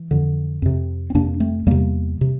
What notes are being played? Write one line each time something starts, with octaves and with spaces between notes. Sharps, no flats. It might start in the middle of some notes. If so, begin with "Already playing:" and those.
Already playing: E3
F2 D3
F2 C3
C4
F2 C3 A#3 D4
A3 C4
E2 C3 G3 A#3
C3